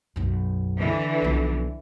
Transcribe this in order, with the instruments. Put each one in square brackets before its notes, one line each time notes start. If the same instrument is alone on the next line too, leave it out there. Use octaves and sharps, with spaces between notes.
[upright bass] B1 F#2
[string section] D3 E3
[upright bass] B1 F3